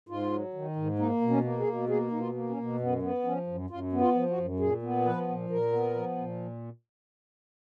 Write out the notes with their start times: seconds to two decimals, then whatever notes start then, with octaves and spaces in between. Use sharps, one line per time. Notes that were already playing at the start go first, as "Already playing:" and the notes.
0.09 G#2 F4
0.32 F#3
0.54 D#3
0.76 G#2
0.99 A#3 D#4
1.22 B2
1.30 C#4
1.44 A#3
1.60 G#4
1.67 B2
1.89 A#3 G#4
2.10 B2 D#4
2.19 F4
2.34 A#3
2.50 C#4
2.57 B2
2.79 F#2 B3
3.02 B3
3.25 F3 C#4
3.47 F#2
3.70 F#2 F4
3.93 B3
4.00 F4
4.14 F3
4.30 F#4
4.38 F#2
4.60 A#2 G#4
4.82 B3
5.05 F3 B4
5.28 A#2
5.50 A#2 A#4
5.72 B3
5.95 F3
6.17 A#2